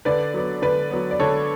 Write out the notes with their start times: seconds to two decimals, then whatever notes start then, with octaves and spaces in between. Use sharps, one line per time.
0.05 D3 B4 D5
0.34 F#3 B3
0.62 D3 B4 D5
0.91 F#3 B3
1.11 D5
1.20 D3 A4 C#5